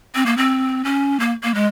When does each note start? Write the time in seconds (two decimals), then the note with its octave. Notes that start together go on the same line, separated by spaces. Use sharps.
0.15 C4
0.26 A#3
0.37 C4
0.85 C#4
1.20 A#3
1.43 A#3
1.55 G#3